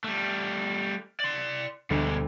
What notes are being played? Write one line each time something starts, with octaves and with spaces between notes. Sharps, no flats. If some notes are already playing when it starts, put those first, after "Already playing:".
G3 A3 F6
D5 C6
D2 B2 G3 G#3 C#7